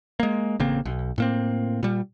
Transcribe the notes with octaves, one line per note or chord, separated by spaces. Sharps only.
G#3 A#3
A1 C#3 A#3 C4
B1
A2 A#3 C4
A#2 G3